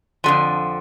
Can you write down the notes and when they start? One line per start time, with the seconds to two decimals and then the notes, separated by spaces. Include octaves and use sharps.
0.24 F2 D3 F3